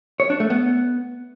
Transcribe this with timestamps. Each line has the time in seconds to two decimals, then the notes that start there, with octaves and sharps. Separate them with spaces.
0.20 C#5
0.30 D4
0.40 A3
0.50 B3